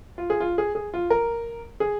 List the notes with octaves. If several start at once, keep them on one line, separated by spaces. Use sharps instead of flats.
F4
G#4
F4
G#4
G#4
F4
A#4
G#4